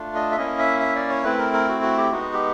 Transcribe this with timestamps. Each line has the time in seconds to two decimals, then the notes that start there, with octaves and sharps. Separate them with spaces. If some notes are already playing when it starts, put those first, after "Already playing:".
Already playing: A3 D4 F4
0.15 D#5
0.32 E5
0.37 A#3 C#4 E4 D#5
0.59 E5
0.80 E5
0.96 D5
1.10 C#5
1.23 A3 C4 E4 B4
1.38 A#4
1.53 A#4
1.68 F#4
1.82 F#4
1.98 G4
2.11 G#3 B3 D#4 F#4
2.33 G4